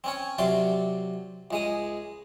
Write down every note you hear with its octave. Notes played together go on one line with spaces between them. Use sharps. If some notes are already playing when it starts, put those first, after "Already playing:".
C4 C#4 C#5
C3 F#3 D5 C6 D6
C#2 G#3 D#6